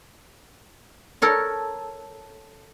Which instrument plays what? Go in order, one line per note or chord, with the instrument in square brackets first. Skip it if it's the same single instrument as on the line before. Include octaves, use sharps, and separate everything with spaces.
[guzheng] A4 A#4 C#5